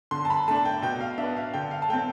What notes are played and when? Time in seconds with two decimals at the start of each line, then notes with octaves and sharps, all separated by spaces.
0.11 D3 C6
0.25 A5
0.30 B5
0.48 A3 D4 A5
0.65 G5
0.82 B2 G5
1.01 F5
1.18 D4 E5
1.23 B3
1.36 F5
1.54 D3 G5
1.71 F5
1.82 A5
1.89 A3 C4 G5